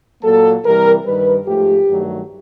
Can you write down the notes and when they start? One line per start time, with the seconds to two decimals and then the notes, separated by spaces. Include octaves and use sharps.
0.23 A#2 F#3 A#3 A4
0.64 C3 E3 G3 A#4
1.04 G2 D#3 G3 B4
1.46 G#2 F3 A3 G4
1.88 G2 D#3 F#3 A3